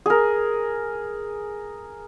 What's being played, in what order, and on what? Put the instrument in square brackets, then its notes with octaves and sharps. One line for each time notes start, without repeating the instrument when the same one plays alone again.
[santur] G#4 A#4